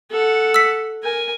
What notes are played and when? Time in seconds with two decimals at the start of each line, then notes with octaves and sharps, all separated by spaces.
0.11 A4 F#5
0.54 E6 B6
1.03 A#4 G#5